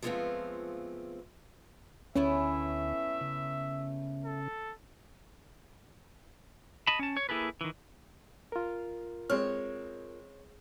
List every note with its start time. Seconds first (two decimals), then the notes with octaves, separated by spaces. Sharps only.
0.02 F3 G#3 A3 B3 C4 F4
2.16 D2 A3 B3 C#4 E4 E5
3.21 C#3
4.25 A4
6.87 D#5 A5 B5
6.99 C#4 A5
7.17 C#5
7.29 A#3 E4 G#4 A4 B4
7.61 D#3 E3
8.52 F4 A#4
9.30 G#3 C4 C#5 F6